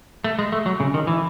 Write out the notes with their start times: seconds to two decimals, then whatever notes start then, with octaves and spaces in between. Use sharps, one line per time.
0.24 A3
0.39 G#3
0.52 A3
0.66 F#3
0.80 C#3
0.94 D#3
1.07 E3